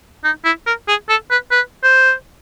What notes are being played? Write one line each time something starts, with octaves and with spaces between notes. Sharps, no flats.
D#4
E4
A#4
G#4
A4
B4
B4
C5